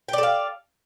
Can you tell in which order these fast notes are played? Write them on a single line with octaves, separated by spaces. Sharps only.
G5 D5 A4 F5